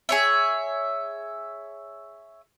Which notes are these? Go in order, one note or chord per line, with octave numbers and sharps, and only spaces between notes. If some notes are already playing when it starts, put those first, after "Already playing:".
G#4 C#5 E5